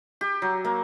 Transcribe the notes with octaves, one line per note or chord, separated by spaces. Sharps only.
G4
F#3
A#3